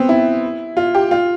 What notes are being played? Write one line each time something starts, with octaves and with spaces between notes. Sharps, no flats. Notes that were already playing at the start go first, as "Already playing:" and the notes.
Already playing: B3 C4
E4
F4
G4
F4